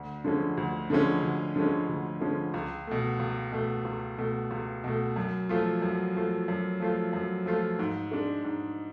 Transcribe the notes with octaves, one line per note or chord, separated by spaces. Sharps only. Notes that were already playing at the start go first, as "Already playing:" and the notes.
Already playing: D2
D3 F3 G#3 C#4
D2
D3 F3 G#3 C#4
D2
D3 F3 G#3 C#4
D2
D3 F3 G#3 C#4
C#2
B2 A3
C#2
B2 A3
C#2
B2 A3
C#2
B2 A3
F#2
F3 A3 F4
F#2
F3 A3 F4
F#2
F3 A3 F4
F#2
F3 A3 F4
G#2
G#3 D4
G#2